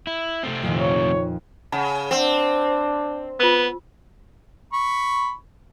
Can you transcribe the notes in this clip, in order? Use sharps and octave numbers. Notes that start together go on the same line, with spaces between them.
E4
C3 A3 C4
F2 A#2 D#3
C#5
C#3 F#5 A5
C4 D4 F#5 E6
B3 F4 E6
B5 C#6